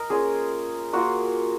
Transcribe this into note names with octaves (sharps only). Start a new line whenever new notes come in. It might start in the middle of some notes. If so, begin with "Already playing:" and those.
Already playing: A#4 D#5
A#3 C#4 F4 G#4
A#3 F4 F#4